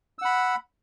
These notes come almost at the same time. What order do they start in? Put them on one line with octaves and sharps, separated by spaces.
E6 F#5 B5